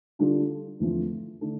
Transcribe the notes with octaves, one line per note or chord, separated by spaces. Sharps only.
D3 G3 D4 F4 A4
E2 D3 F3 A3 C4
D3 A3 D4 A4